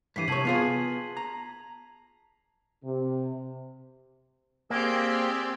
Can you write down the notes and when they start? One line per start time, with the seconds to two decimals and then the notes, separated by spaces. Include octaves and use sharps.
0.16 G2 E3 B6 C7 D#7
0.28 C3 C#5 A5 G#6 F#7
0.45 B3 F4 G#4 C7
1.17 A#5
2.84 C3
4.70 A#3 C4 G4 G#4 D5 E6